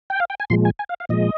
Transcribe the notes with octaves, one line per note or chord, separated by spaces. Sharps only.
G5
F5
G5
G#5
A#2 F3 G#3 C6
G#5
G#5
F5
F5
A#2 F3 G#3 D#5